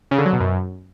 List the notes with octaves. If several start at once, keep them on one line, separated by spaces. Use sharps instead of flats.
C#3
D3
F#3
B2
F#2